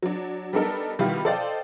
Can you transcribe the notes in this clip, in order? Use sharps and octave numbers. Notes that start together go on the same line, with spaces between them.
F#3 D4
G3 B3 D4 D#4 A4 A#4
B2 D#3 G3 E4 F4 G4
A4 C5 D5 D#5 F5 G5